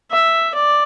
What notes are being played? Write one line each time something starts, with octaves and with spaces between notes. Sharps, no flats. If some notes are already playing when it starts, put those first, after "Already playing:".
E5
D5